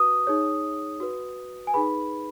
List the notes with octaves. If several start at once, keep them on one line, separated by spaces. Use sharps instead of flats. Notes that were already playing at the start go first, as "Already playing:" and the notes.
Already playing: F#4 B4 D#6
D#4 G#4 C#5
F#4 B4
G#5
D#4 G#4 B4 B5